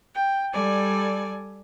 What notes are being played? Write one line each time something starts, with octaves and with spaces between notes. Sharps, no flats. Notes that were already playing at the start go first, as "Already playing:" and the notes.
G5
G3 A4 D5 G#5